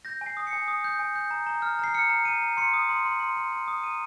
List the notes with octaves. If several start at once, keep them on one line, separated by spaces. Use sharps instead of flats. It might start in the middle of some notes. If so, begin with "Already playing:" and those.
G6 A#6
G#5
C7
D#6
C#7
G#5
D#6
G6
G#5
G6
A#5
A#5
F6
A#5 C7
F6 C#7
A#5
A#5 D#7
A#5
C6 C#7
D#6
C6
C6
C6
C6
C6
D#6
A#5 D#7